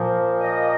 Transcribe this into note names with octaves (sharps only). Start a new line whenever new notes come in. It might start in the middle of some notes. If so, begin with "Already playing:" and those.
Already playing: A#2 F3 A#3
D#5